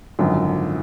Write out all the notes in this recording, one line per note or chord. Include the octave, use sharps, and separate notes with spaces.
G#1 F#2 D3 F3